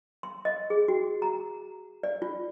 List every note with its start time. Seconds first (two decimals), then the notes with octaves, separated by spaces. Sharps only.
0.23 C6
0.45 D#5
0.70 G#4
0.88 F#4
1.22 A#5
2.03 D5
2.22 F4